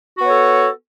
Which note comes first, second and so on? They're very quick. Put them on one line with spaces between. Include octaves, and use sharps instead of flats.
F#4 B3 C#5 A4